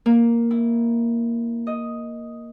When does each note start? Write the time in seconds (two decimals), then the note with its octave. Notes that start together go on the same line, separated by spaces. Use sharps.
0.06 A#3
0.51 E4
1.67 D#5